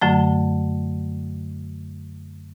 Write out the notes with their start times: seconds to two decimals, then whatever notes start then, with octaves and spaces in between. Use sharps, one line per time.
0.01 F#2 D3 F#3 A3